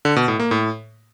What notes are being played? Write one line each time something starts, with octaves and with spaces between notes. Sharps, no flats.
D3
B2
A2
A#3
A2